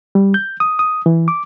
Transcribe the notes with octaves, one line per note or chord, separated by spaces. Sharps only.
G3
G6
D#6
D#6
E3
D6